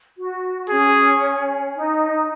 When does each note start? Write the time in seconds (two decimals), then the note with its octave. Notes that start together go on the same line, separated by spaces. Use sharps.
0.18 F#4
0.70 C#4 G#4
1.75 D#4